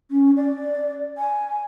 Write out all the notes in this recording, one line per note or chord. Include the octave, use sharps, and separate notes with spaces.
C#4
D5
G#5